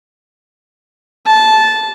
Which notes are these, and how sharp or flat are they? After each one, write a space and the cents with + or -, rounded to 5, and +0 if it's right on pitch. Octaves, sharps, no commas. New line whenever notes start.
A5 -10